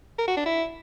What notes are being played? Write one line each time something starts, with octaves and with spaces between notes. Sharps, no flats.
A#4
F#4
D4
E4